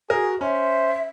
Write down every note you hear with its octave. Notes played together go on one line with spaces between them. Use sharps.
F#4 G#4 A#4
C#4 C5 E5